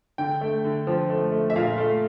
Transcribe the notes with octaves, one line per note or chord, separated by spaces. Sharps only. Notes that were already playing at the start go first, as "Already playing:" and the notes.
D3 G5
A3
D3
F3
A3
A3
E5
A#2 F5
A3